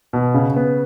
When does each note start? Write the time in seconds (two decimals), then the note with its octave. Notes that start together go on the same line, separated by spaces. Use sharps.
0.13 B2
0.34 C#3
0.56 B3